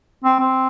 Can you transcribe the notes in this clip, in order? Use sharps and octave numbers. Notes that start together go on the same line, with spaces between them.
C4
C4